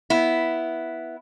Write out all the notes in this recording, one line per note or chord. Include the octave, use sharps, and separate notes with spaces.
B3 E4